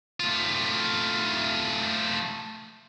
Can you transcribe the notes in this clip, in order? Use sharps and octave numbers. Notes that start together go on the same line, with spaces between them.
A3 F4